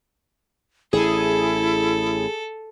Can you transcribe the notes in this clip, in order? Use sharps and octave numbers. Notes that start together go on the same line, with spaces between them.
A1 E4 G#4 A4